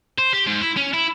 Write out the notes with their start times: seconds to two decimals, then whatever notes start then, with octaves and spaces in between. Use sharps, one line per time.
0.18 C5
0.33 G4
0.47 G#2
0.62 E4
0.77 C#4
0.94 E4